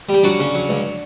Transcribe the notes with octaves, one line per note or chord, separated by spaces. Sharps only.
G3
G4
F#3 D4 F#4
C#3
F#3
C#2